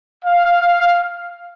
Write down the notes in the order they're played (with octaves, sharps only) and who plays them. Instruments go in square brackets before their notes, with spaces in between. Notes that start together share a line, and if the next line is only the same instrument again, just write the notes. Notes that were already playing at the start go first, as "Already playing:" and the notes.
[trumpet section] F5